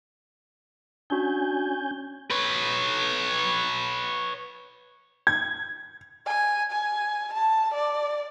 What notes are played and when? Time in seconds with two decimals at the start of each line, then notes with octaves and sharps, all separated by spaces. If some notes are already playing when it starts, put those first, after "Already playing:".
1.10 C#4 D4 F#4 G#5 G6
2.30 B4 C#5
5.27 G#6
6.26 G#5
6.72 G#5
7.33 A5
7.74 D5